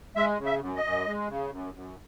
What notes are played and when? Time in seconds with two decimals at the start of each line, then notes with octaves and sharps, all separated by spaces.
0.16 G#3 E5
0.39 C#3
0.46 E5
0.61 F#2
0.76 D#5
0.84 F#2
1.07 G#3
1.29 C#3
1.51 F#2
1.74 F#2